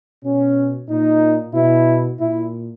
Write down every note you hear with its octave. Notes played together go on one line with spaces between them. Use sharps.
B2 C#4
A#2 D#4
B2 E4
A#2 E4